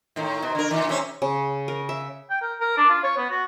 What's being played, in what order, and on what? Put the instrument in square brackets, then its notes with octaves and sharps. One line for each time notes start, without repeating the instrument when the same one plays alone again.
[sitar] A2 D#3
B2
D3 A#4
A#2 D#3
D#2 C3 C#4
[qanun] C#3
A#4
E5
[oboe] G5
A#4
A#4
D4
F4
C#5
B3
F#4